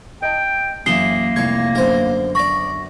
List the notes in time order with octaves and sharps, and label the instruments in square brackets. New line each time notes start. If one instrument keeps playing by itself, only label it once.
[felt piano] D#5 A5 [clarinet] G5
[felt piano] F#2 E3 E7 [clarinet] A#3 [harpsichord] G#4 [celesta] C7 G7
[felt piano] F1 C2 C7 [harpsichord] F5 C#6 [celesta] G#6
[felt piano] F#2 D3 B3 [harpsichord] A#4 C5
[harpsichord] D5 B5 [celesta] C#6 A#6